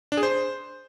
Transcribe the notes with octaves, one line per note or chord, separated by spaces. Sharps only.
D4
G#4
C5